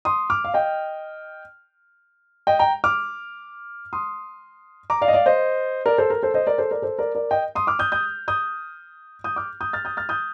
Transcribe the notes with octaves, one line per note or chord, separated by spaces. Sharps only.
C6 D#6
D6 F6
F5
D#5 G5
D#5 G5
G5 A#5
D6 F6
C6 D#6
A#5 D6
D5 F5
D#5
D5 F5
C5 D#5
A#4 D5
A4 C5
A#4
A4 C5
C5 D#5
A#4 D5
A4 C5
A#4 D5
A4 C5
A#4 D5
A#4 D5
D#5 G5
C6 D#6
D6 F6
D#6 G6
D#6 G6
D#6 G6
D#6 G6
D6 F6
D#6 G6
F6 A6
D#6 G6
F6 A6
D#6 G6